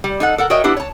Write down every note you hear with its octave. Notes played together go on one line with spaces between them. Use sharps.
G3
D#4 A4 F#5
A4 A#4 F#5
F#4 A#4 C#5 D#5 E5 G5
B3 D4 E4 G4
C#5 A5